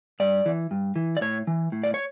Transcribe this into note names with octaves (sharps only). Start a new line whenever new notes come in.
G2 D5
E3
G2
E3
D5
A2 C#5
E3
A2
D5
C#5